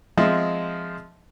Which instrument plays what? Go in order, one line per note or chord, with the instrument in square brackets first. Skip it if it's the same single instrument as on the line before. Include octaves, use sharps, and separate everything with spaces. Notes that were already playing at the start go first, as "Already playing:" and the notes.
[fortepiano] F3 G#3 C4 D#5 E5